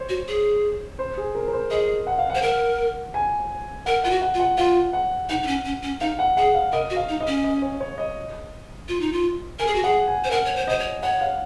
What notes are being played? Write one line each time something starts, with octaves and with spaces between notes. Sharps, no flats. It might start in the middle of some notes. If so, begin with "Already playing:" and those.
Already playing: C5 C#5
F#4
G#4
C5
G#4
A#4
A#4
C5
G#4 D#5
F#5
F5
F#5
C5
A#4 F#5
G#5
A#4 F#5
F4 F#5
F#4
F#5
F4
F#5
F4 F5
F#5
D#4 F#5
D#4
C#4
C#4
C#4
D#4 F5
F#5
G#4 F#5
F5
A#4 D#5
F#4
F5
D#4
D#5
C#4
D#5
C#5
C#5
D#5
F4
D#4
F4
A#4 G#5
G#4
F#4
G#4 F#5
G#5
C5
A#4 F#5
C#5
C5
C5 D#5
C#5
C#5 F#5
F5